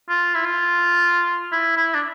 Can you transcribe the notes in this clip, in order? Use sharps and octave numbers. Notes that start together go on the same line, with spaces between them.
F4
E4
F4
E4
E4
D4